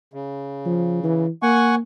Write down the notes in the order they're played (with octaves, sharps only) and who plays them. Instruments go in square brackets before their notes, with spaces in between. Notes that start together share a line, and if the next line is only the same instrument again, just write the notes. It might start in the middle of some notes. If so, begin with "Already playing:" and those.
[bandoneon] C#3
[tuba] F3
E3
[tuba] A#3 [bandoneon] F#5 G#5 C#6